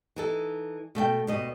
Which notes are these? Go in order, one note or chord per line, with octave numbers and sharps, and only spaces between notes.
E3 D#4 A4
B2 A3 E5 G5
D2 B2 D#5